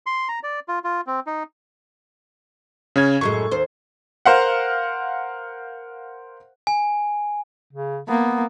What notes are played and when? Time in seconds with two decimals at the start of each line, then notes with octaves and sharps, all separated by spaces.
0.06 C6
0.29 A#5
0.43 D5
0.68 F4
0.84 F4
1.07 C4
1.27 D#4
2.96 C#3 C#4 G#6
3.21 F#2 A2 G#3 C#6
3.51 D#2 C5
4.25 A#4 C5 F5 F#5
6.67 G#5
7.73 C#3
8.09 A#3 B3